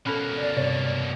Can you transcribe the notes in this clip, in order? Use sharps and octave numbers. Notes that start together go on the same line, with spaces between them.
B2 A#3 C#4 A4 B5 F6 F#6
D5
G2 C3 C#5